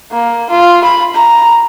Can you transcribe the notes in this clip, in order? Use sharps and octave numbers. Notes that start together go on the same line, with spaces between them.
A#3
F4
B5
A#5